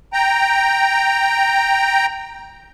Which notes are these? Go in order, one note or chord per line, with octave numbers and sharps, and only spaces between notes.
G5 A#5